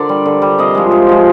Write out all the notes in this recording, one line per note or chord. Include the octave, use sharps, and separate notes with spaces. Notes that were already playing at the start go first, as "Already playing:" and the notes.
Already playing: D3 A#4 C5 D5
G3
D3
G3
C3 D#5
F3 G#3
C3
F3 G#3